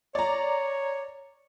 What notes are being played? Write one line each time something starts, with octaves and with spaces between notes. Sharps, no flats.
C#5 D5 A#5